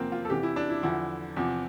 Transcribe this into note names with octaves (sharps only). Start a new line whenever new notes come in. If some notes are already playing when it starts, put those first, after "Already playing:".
Already playing: E2 C3 F3 A#3 C4
F4
A4
E2 C3 E3 G4
E4
D4
E4
E2 D3 F3 E4
E2 C3 F3